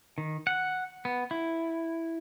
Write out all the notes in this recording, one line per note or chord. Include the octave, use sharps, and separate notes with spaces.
D#3
F#5
B3
E4